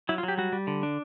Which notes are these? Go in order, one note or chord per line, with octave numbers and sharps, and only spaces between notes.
F#3 E4
F4
F#3
G4
G3 F#4
G3
D3
D4